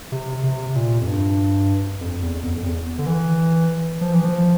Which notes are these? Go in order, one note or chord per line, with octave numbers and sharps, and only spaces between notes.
C3
C3
A#2
F2
G2
F2
E2
F2
F2
E2
D3
E3
F3
E3
F3